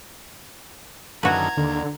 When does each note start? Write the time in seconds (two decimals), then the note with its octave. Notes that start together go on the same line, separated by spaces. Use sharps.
1.23 F#2 D3 D#3 E4 F#4 B4 A#5 G#6
1.57 D#2 D3